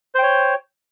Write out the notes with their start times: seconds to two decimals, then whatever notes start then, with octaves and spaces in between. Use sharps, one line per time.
0.15 C5
0.19 G5
0.23 C#5